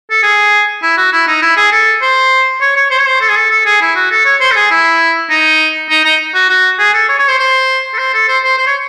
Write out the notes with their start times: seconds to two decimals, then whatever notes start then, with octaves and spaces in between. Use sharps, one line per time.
0.11 A4
0.23 G#4
0.83 E4
0.97 F#4
1.13 E4
1.27 D#4
1.42 E4
1.57 G#4
1.72 A4
2.02 C5
2.61 C#5
2.76 C#5
2.91 C5
2.99 C#5
3.06 C5
3.21 A4
3.29 G#4
3.36 A4
3.51 A4
3.66 G#4
3.81 E4
3.96 F#4
4.11 A4
4.25 C#5
4.40 C5
4.52 A4
4.56 G#4
4.71 E4
5.30 D#4
5.90 D#4
6.05 D#4
6.34 F#4
6.49 F#4
6.79 G#4
6.94 A4
7.09 C#5
7.19 C#5
7.29 C5
7.39 C5
7.94 A4
7.98 C5
8.14 A4
8.28 C5
8.44 C5
8.58 C5
8.67 C#5